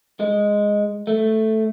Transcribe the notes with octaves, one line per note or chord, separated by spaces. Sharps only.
G#3
A3